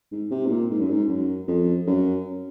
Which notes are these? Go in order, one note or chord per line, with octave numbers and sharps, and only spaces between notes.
G#2
C3
G#2
A#2
G#2
F#2
G#2
F#2
F2
F#2